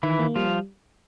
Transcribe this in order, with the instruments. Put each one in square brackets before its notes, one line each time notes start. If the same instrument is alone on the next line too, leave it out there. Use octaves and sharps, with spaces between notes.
[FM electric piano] D#3 [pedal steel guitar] E3 E4
[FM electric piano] A#3
[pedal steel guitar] F3 F4 [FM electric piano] G3